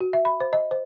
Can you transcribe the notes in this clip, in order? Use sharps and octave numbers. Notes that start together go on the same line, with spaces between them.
F#4
E5
B5
C5
D#5
C5